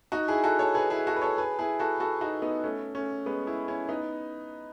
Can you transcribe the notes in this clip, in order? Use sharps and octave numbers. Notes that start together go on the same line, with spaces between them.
D#4 F#4
E4 G#4
F#4 A4
A4 C#5
G#4 B4
E4 G#4
F#4 A4
B4
A4 C#5
G#4 B4
E4 G#4
F#4 A4
F#4 A4
D#4 F#4
B3 D#4
A3 C#4
A3 C#4
G#3 B3
E4 G#4
C#4 E4
B3 D#4